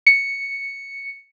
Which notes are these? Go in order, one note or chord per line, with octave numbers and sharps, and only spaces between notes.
C#7